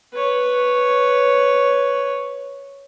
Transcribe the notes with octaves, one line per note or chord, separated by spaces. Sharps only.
B4 C#5